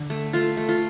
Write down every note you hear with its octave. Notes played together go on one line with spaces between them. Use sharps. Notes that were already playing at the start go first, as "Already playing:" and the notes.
Already playing: D3
A3
A3 F4
A3
F4